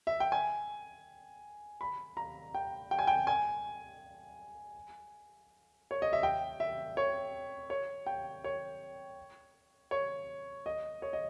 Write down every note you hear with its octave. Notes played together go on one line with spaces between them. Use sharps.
E5
G5
G#5
B5
A#5
G5
G5
G#5
G5
G#5
C#5
D#5
E5
G5
E5
C#5
C#5
G5
C#5
C#5
D#5
C#5
D#5